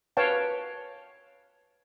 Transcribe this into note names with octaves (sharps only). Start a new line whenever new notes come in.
B4 C#5 F5 G5 A5